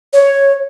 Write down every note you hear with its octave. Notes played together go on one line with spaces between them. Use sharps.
C#5